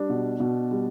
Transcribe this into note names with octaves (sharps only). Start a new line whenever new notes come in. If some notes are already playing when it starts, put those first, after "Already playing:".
Already playing: G3 D4
B2
B2
G3